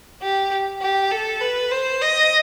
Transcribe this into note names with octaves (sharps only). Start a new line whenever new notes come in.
G4
G4
A4
B4
C5
D#5